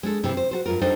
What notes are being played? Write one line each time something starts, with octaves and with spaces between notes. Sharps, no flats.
G#3 D4 A4
G2 C3 E4
C5
F#4 A4 C5
G2 F4 A#4
G3 D4 D#4 A4 C5 D#5